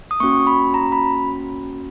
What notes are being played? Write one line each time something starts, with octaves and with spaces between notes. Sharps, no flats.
D#6
A#3 C#4 F#4 C#6
B5
A#5
B5